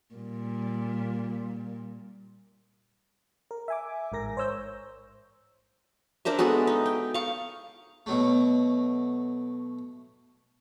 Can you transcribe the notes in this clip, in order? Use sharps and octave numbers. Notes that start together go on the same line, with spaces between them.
A#2 G3
A#4
E5 G#5 D6
A1 G#2 A#4 A#6
C5 C#5 E6 G6
D4 A#4 C5 E5
G#3 B3 F#4 A4
D#4
G5
F5 C#6
B2 F#3 A3